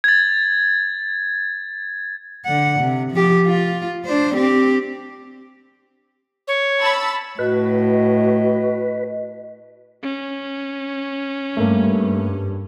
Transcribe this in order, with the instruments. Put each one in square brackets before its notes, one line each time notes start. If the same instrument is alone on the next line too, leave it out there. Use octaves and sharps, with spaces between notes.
[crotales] G#6 A6
[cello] D3 F#5
C3
F3 G4
F4
D4 C5
C4 G4
[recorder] C#5
[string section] A5 B5 E6
[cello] A2 [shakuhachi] F#4 [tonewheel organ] B4 [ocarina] D#5
[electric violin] C#4
[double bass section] G2 [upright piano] A3 A#3